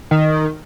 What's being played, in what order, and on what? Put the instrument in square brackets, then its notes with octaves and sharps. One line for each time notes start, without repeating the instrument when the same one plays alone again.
[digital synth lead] D#3